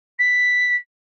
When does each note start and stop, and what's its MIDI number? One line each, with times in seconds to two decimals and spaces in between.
0.19 0.76 95